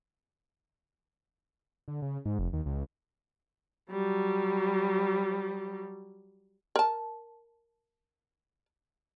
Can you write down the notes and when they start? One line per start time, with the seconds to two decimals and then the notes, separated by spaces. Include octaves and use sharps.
1.88 D3
2.02 C#3
2.25 G#2
2.39 F1
2.53 D#2
2.66 C#2
3.91 F#3 G3
6.76 A#4 A5